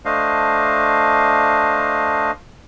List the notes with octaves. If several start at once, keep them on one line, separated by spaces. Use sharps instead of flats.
A3 D4 C5 D#5 F5